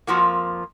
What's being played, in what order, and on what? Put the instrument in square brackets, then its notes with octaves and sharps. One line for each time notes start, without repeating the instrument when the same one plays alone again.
[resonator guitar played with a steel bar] F2 F3 A#3 F#4